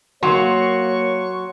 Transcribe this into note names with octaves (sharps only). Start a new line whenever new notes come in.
F#3 A#3 C#5 C6 C#6